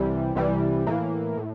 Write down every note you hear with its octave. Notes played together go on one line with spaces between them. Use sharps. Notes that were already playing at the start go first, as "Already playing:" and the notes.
Already playing: C2 C3 E3 G3
C2 C3 E3 G3
A2 E3 A#3
A2